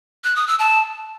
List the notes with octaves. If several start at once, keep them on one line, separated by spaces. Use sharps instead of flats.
F#6
D#6
E6
A5